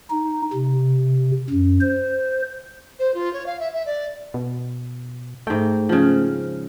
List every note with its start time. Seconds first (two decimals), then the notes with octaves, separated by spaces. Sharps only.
0.10 D#4
0.53 C3
1.50 F#2
1.81 C5
2.99 C5
3.14 F4
3.33 C#5
3.46 F5
3.60 E5
3.74 E5
3.86 D5
4.34 B2
5.47 G#2 A3 G5
5.89 C#3 F3